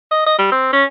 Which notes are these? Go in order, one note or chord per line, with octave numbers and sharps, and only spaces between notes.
D#5
D#5
G3
C4
C#4